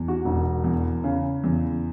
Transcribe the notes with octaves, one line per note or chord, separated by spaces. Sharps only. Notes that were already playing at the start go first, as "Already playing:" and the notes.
Already playing: E2
F#4
E1
E2
C#3
E2